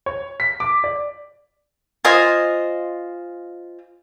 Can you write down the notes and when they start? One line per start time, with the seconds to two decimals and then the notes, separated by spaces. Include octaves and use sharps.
0.06 C#5
0.40 B6
0.60 D6
0.84 D5
2.05 F4 C5 D#5 G#5